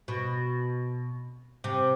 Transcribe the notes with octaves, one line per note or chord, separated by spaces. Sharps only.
B2
C3